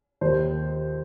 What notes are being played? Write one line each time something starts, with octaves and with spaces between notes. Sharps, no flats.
D#2 D#3 C5